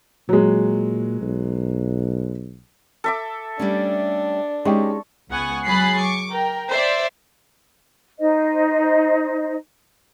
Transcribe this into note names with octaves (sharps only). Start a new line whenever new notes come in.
A#2 F#3 G#3
B1
A4 E5 D6
G3 A3 C#4 D4
G#3 C#4 D#4 G4 C#6
C#2 B3 F#5 G#5 C#6
F#3 G#4 B5 F#6 A6 C7
C#6 D6
A#4 G5
C5 D5 E5
D#4 C5 D#5